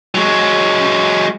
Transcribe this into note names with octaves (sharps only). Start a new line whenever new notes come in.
F#3 G#3